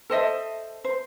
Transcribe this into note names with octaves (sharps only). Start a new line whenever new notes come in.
A4 C5 D#5 E5
C5